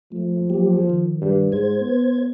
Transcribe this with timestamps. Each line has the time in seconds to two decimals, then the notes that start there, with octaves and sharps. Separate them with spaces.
0.12 F3 A3
0.50 F#3 A#3 G4
0.90 D#3
1.21 G2
1.52 G#2 C5 G#6
1.81 B3